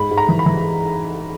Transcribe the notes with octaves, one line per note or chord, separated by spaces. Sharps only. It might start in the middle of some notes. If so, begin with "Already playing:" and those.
Already playing: G#2 B5
G#2
A#5
E3
B5
E3